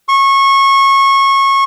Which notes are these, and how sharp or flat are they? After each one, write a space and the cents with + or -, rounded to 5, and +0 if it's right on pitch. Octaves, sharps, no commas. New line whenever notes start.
C#6 -20